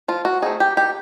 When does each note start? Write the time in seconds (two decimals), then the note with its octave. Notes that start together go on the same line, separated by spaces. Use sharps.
0.08 F3 F4
0.25 F#4
0.42 A3 C4 D#4 G#4
0.60 G4
0.77 D#3 G4